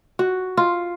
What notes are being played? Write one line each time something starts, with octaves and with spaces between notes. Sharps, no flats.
F#4
F4